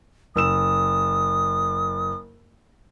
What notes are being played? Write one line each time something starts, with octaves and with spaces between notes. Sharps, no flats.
F#1 D#6 E6 E7